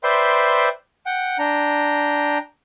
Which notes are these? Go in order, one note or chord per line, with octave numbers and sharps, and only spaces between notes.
B4 C5 D5 E5 G5 C6
F#5 G5
D4 G5 A#5